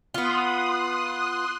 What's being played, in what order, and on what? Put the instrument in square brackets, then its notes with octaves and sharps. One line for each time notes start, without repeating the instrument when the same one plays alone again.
[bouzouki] B3 F4 [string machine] C6 D#6 F#6